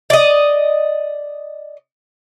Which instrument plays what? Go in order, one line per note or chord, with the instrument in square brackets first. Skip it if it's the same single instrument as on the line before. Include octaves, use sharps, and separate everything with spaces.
[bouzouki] D5 D#5